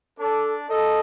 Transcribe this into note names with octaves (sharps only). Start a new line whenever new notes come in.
D4 A4 D5
D#4 A4 D#5